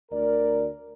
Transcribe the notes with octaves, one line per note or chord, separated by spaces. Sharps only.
D2 A#4 D5